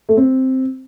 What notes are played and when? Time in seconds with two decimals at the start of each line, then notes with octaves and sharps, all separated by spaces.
0.09 A3
0.17 C4